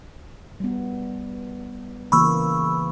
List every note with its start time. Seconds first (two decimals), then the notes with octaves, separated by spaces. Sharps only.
0.60 G3 B3
2.12 C#3 E3 A#3 B5 C#6 E6